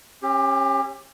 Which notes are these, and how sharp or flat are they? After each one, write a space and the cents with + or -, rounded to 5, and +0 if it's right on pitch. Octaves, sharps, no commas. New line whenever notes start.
C#4 -35 G4 +20